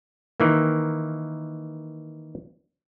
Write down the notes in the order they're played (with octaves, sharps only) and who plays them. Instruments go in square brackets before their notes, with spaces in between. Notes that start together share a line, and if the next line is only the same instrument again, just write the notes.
[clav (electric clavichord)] D#3 E3 A#3